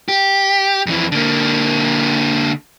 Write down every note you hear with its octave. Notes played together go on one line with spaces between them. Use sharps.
G4
F2 E3
D3 A#3